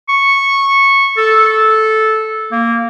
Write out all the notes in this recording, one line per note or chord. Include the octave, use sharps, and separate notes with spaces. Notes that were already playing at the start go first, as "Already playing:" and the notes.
C#6
A4
A#3